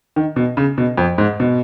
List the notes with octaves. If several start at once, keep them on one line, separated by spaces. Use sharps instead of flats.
D#3
B2
C#3
B2
F2
G#2
B2